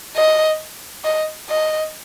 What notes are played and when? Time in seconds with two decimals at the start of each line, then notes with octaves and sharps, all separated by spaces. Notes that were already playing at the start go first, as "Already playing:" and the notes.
0.16 D#5
1.04 D#5
1.49 D#5